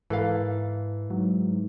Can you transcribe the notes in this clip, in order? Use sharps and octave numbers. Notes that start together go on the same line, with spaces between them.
G#2 E3 A4 A#4 F5
G#2 F#3